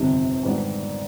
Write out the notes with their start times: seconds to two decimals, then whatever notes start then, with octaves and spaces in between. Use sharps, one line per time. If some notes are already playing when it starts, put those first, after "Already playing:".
Already playing: G1 F2 C3 D#3
0.43 G#2 D#3 G3 B3 D4